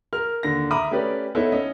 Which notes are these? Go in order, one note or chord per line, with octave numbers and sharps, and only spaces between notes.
A#4 F6
D#2 D3 A#6
E5 A#5 B5 D6 D#6
A3 C#4 G4 B4 D5
B3 D#4 E4 A4 B4 C#5
C#4 D#5